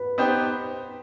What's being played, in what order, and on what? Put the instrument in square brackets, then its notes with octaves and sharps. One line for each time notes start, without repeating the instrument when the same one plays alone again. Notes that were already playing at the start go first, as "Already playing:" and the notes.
Already playing: [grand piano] B4
[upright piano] B3 D#4 G4 C5